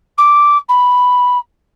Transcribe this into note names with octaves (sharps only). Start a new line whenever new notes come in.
D6
B5